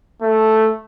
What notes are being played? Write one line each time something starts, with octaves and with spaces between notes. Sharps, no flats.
A3